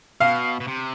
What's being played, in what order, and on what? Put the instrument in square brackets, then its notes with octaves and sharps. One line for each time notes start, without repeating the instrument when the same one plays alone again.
[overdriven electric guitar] B2 [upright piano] F5
[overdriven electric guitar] B2
C3